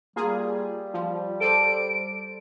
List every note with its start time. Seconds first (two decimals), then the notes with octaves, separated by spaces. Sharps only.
0.16 G3 A#3 F4 G#4
0.94 F3
1.41 A4 C5 D5 D7